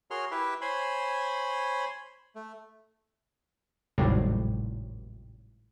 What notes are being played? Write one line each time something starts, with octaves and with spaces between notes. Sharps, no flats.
F#4 G#4 A#4 C#5 C6 F6
E4 G4 B4 E5
C5 C#5 G#5 B5 C6
A3
G#1 D#2 A2 C3 F#3 G3